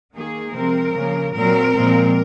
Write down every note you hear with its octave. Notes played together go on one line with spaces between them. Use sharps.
D#3 A#3 G#4
C3 F3 G#3 C4 A#4
C#3 F3 A#3
A#2 F#3 C4 A#4
A#2 F3 G#3 C4